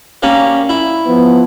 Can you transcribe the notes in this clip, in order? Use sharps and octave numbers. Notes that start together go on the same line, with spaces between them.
G3 A#3 C#4
E4
F3 B3